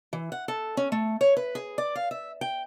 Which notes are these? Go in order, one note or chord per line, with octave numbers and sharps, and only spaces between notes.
E3
F#5
A4
C#4
A3
C#5
B4
G#4
D5
F5
E5
G5